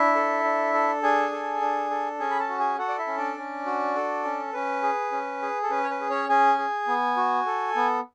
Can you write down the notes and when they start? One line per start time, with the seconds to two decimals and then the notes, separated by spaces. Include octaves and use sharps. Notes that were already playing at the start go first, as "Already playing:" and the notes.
Already playing: D4 E4 E5
0.15 A4
0.44 D4
0.74 A4
1.03 D4 G#4 G#5
1.32 A4
1.61 D4
1.90 A4
2.19 C#4 G#4 G#5
2.31 B5
2.39 A4 A5
2.49 F#4
2.58 G#4 G#5
2.78 F#4 A4 F#5
2.88 D5
2.98 E4 E5
3.07 C#4
3.17 D4 D5
3.37 C#4
3.66 F#4
3.96 A4
4.24 C#4
4.53 C#4 B4
4.83 G#4
5.12 C#4
5.42 G#4
5.63 A4
5.70 C#4 B4
5.84 C#5
5.90 B4
6.00 G#4
6.10 C#4 C#5
6.29 C#4 G#4 G#5
6.58 G#4
6.87 B3
7.17 F#4
7.46 A4
7.76 B3